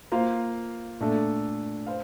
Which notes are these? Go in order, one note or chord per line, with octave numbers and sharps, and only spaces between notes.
A#3 F4 C5 F5
A#2 A3 D4 A4
C5 F5